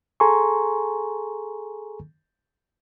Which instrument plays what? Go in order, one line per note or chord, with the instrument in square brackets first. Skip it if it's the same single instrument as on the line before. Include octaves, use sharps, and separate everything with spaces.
[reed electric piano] G#4 A4 G#5 A#5 C6 C#6